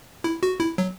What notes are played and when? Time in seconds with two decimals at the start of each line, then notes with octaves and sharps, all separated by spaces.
0.24 E4
0.43 F#4
0.60 E4
0.78 F#3